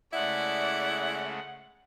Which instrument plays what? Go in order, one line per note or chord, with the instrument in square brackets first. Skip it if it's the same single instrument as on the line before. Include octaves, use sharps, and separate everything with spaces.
[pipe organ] C#3 G#3 A3 [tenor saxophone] E4 [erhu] D5 [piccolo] F#5